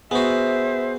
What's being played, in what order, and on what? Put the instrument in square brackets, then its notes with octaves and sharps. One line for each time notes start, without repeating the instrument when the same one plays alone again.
[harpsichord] B3 F#4 [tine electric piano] G#4 [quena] C5 [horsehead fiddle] E5